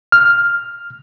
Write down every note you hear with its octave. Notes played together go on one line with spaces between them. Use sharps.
F6